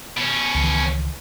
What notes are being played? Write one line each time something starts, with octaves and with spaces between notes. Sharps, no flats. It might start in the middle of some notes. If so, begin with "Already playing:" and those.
B2 C#4
C#2 D#3 E3